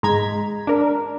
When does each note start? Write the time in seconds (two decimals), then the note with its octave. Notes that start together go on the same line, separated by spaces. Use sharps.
0.03 G#2 G#3 A#5 G#6 B6
0.67 D4 A#4